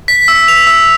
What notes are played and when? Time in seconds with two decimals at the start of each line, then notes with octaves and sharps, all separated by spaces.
0.08 B6
0.28 E6
0.48 F7
0.67 E6